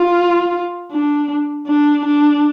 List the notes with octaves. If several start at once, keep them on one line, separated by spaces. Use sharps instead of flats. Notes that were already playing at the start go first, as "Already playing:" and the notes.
Already playing: F4
D4
D4
D4